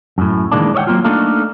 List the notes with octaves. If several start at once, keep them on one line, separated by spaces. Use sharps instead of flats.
F#2 A2
D#3 E3 G#3 A#3 D4
C#5 D5 E5 F#5 G5
F#3 A3 A#3 C4 F4
A3 A#3 D4 D#4 A4 F5